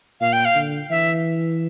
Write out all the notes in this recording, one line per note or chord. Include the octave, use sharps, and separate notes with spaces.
A#2 F5
G5
F5
D3
E3 E5